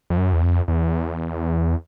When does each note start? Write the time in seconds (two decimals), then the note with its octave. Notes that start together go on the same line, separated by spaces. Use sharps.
0.10 F2
0.18 F#2
0.33 E2
0.43 F2
0.68 E2